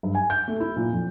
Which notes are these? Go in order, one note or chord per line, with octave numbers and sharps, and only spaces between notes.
G2
G#5
G6
A3
E4
A#2
F2